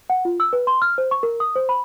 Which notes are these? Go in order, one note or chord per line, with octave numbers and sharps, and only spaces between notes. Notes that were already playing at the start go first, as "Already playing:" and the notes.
F#5
F4
E6
B4
C6
F6
C5
C#6
A#4
D#6
C5
B5